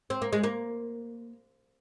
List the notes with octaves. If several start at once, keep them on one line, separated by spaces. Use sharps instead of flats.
C4
A#3
G#3
A#3